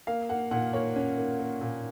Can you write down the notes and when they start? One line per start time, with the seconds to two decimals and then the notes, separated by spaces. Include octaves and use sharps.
0.07 A#3 F5
0.29 A#3 F#5
0.51 A#2 F#5
0.73 A#3 C#5
0.96 C#4
1.17 A#3
1.39 A#3
1.61 A#2